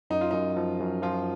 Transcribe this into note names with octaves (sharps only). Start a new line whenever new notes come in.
F#2 D#4
F4
F#2 D#4
F3
F#2
F3 F4